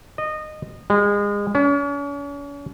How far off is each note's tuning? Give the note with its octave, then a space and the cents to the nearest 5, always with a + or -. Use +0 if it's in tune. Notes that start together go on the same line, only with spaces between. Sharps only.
D#5 -20
G#3 -30
C#4 +40